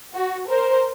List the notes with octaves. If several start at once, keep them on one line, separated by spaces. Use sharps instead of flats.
F#4
A#4 C5